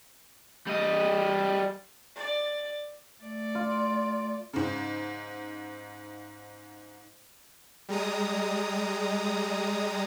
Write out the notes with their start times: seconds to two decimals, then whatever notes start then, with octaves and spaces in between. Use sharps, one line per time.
0.67 G3 D#5
2.16 D5
3.22 A3 D5
3.55 F4
4.53 G#2 C#3
7.89 G3 G#3 A#5 D#6